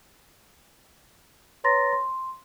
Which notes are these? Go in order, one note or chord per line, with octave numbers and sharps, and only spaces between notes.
B4 C#5 A#5 C6 A6 A#6
C6